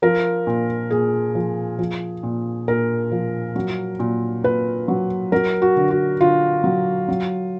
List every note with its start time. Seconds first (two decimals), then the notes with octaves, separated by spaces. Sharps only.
0.02 F3 A#4
0.47 A#2
0.90 A#2 G#4
1.35 F3
1.79 F3
2.23 A#2
2.68 A#2 A#4
3.12 F3
3.56 F#3
3.99 A#2
4.44 A#2 B4
4.88 F#3
5.32 F#3 A#4
5.62 F#4
5.77 D3
5.91 F#4
6.20 D3 F4
6.64 F#3
7.08 F#3